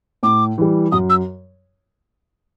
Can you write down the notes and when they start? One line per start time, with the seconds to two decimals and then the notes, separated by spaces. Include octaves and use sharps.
0.23 A2 D6
0.58 E3 G3
0.92 F#2 D#6
1.10 E6